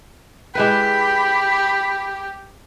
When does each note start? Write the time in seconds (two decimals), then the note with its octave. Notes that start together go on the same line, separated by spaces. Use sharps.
0.55 G#3 E4 G4 B4 B5